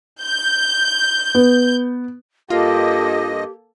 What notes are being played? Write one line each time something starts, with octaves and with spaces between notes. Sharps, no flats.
G6
B3
G2 A#3 F4 G4 A4 D#5